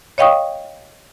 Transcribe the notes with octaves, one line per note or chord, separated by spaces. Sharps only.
C#5 D#5 F5 G5 C#6 D#6